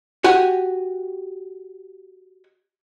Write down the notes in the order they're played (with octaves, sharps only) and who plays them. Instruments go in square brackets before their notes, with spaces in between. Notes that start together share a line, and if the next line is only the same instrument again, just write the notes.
[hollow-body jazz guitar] F#4 G4 G#5